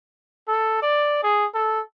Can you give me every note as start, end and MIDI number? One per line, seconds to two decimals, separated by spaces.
0.48 0.78 69
0.82 1.18 74
1.23 1.46 68
1.54 1.80 69